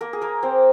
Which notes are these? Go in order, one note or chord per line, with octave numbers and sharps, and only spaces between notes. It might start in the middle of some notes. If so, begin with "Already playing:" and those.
A#3 A#4
G#4
A#3 A#4
C4 C5